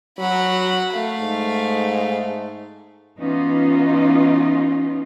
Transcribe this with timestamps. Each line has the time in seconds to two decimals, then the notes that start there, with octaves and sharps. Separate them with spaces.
0.19 F#3 F#5 B5
0.92 A3 F5
1.20 G#2
3.18 E3 B3 C#4 D#4 F4